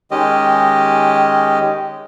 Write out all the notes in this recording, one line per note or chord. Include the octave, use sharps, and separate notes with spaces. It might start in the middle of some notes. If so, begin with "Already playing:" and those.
D#3 G#3 C#4 G4 D#5